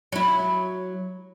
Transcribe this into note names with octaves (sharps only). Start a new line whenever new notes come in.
F#3 E4